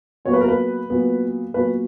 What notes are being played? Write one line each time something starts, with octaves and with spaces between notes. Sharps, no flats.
A#2 F#3 B3 C#5
B4
A#4
B4
A#2 F#3 B3
A#2 F#3 B3 B4